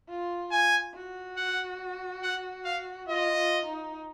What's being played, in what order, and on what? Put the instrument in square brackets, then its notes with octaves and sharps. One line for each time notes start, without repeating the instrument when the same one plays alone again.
[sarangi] F4
[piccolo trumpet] G#5
[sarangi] F#4
[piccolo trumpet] F#5
F#5
F5
[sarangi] F4 [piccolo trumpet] D#5
[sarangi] F4
D#4